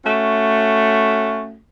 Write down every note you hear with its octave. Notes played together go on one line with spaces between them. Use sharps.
A3 C#4 F#4